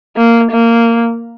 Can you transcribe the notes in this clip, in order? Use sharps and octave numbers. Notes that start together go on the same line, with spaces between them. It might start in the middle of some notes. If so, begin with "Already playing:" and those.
A#3
A#3